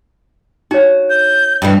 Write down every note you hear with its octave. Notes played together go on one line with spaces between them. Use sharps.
D#4 F#4 C#5
G6
G2 B2 E3